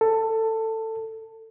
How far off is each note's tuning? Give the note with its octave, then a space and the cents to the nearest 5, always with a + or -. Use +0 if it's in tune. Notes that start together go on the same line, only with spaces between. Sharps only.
A4 +15